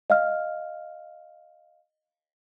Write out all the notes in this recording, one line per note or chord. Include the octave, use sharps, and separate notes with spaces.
D#5 F5 F6